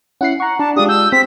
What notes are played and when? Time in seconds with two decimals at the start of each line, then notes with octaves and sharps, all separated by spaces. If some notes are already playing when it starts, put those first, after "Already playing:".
0.21 C#4 E4 F#5 C7
0.40 F#5 A#5 C#6
0.59 D4 A5
0.76 G#3 D4 F4 G4 D#6
0.89 E6 G6
1.12 C4 B6